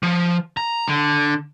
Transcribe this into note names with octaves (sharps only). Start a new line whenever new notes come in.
F3
A#5
D3